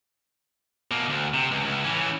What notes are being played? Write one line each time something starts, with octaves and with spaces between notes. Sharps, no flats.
B2 A#3
D2
C3
C#2
C#2
E3 C#4